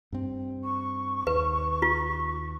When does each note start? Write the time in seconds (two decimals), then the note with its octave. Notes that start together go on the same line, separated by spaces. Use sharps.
0.12 G2 C4
0.64 C#6
1.27 D#2 B4
1.82 F4